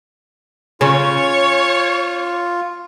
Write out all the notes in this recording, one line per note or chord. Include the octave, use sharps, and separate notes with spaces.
C#3 C#4 F4 C#5